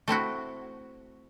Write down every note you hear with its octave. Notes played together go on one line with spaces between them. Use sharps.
A3 C4 E4 F#4